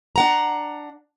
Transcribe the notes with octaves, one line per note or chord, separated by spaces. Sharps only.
D4 F#5 A#5